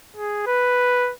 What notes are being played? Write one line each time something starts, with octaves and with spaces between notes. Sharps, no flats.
G#4
B4